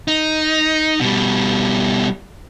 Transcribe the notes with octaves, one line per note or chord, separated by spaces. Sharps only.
D#4
B2 G3